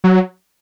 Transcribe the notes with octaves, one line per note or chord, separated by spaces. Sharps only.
F#3